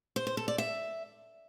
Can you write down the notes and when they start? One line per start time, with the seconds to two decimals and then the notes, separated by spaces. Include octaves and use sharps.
0.16 C5
0.27 C5
0.37 A4
0.48 D5
0.58 E5